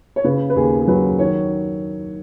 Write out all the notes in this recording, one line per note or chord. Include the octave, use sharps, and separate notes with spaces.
C#5
C#3 B4
B4
D#2 G#4
G#4
F#3 B4
D#3 C#5